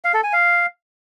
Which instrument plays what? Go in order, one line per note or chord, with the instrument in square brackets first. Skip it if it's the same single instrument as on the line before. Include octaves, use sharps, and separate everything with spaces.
[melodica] F5
A4
G#5
F5